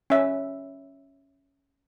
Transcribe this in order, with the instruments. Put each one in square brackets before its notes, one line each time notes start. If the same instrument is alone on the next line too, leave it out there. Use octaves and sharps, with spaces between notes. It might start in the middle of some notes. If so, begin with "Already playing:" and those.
[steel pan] C#4 E5